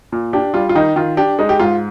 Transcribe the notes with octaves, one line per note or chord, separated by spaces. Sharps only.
A#2
D4 G4
G3 F4
F4
D#3 D#4
D#3 F4
D4 G4
G#3 D#4
G4
G#2 F4